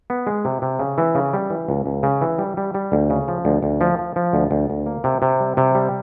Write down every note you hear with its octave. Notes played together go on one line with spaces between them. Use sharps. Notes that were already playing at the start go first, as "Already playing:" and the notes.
B3
G#3
C3
C3
C#3
E3
C#3
G3
E3
C#2
C#2
C#3
E3
G3
G3
G3
D2
C#3
F3
D2
D2
F3
F3
F3
D2
D2
D2
A#3
C3
C3
G3
C3
G3